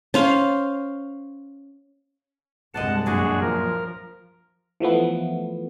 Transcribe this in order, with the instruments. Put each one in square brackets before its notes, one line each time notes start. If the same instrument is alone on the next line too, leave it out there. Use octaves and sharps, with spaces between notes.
[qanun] C#4 C5 F5
[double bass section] C2 G2 G#3 [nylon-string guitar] C5 D5 D#5 [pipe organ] F#5 A5
[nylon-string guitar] F#2 A#2 F#3 [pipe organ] D4 F#4 G#4
[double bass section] G2 F3 [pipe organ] A#4
[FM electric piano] E3 F3 A3 B3